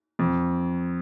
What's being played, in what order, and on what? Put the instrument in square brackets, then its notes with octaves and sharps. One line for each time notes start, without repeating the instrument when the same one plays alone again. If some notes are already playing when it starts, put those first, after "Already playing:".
[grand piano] F2